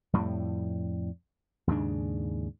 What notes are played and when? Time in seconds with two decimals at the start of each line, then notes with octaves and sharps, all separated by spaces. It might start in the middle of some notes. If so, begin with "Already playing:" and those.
0.13 F2 A2 G3
1.67 D#2 G#2 C#3 D4